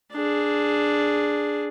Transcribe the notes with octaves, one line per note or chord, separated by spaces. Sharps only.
D4 G#4